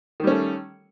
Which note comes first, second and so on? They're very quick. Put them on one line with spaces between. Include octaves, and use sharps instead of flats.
D#3 G3 C#4 A3